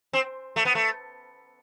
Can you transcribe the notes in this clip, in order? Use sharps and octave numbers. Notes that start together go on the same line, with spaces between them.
C4
A3
B3
A3